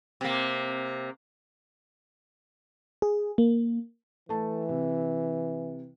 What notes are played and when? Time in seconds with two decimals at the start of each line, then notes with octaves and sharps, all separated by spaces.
0.21 C3 A#3
3.02 G#4
3.38 A#3
4.29 E3 A3 A5
4.69 C3